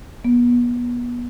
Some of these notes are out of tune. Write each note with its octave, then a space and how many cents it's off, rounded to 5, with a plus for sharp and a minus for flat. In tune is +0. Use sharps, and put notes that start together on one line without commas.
B3 -30